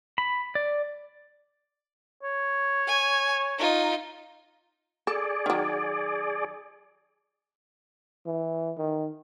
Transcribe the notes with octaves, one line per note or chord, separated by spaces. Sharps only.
B5
D5
C#5
G#5
D#4 F4
G#4 A4 D5
D#3 F#3
E3
D#3